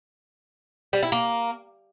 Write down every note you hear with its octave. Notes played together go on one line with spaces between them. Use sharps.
G3
E4
A#3